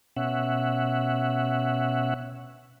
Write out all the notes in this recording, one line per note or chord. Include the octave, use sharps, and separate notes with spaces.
B2 C#4 E5 F#5